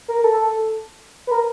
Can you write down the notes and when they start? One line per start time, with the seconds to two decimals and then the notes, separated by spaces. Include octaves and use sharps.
0.08 A#4
0.19 A#4
0.24 A4
1.27 B4
1.31 A#4